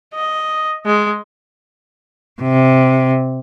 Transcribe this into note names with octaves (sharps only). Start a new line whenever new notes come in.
D#5
G#3
C3